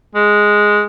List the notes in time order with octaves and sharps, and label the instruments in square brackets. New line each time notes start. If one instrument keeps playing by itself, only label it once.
[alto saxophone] G#3